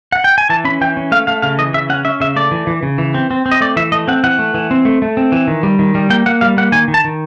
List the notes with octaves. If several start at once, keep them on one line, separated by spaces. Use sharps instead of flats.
F#5
G5
G#5
E3 A5
C#4 B5
E3 G5
C#4
A3 F5
A3 F5
C#3 F5
E3 D#5
C#3 E5
C#4 F#5
C#4 E5
C#3 E5
A3 D5
E3
E3
C#3
E3
C4
C4
C4
D#5
A3 D5
E3 E5
A3 D#5
C4 F#5
E3 F#5
A3
E3
C4
A3
A3
C4
E3
D#3
G3
D#3
G3
A#3 G5
A#3 F#5
G3 F5
A#3 F#5
D#3 G#5
D#3
A5
D#3